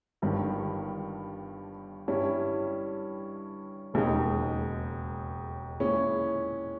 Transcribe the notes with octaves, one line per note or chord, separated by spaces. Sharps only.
G1 G2 D#3
G2 G3 C#4 E4
E1 D#2 C#3 G#3 D#4
A#2 G#3 C#4 E4